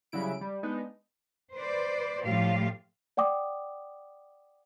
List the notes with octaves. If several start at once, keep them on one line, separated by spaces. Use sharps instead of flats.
C#3 F#3 G3 E4 D7
G3
G#3 B3 D4 D#4
B4 C5 D5
A2 F3 G3 F4 G4 F5
D5 F#5 G5 D6 D#6